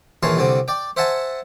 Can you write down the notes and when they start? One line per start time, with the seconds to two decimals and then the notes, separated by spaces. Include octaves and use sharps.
0.23 A#1 D#3 E3 C#5 A5 C6
0.37 C2 D3 C4
0.68 D5 G5
0.97 C5 E5 F#5 G#5 A5